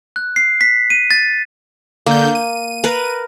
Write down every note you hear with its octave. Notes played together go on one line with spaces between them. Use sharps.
F#6
C7
B6
D#7
A6
D3 A#3 G6
D#7
A#4 B4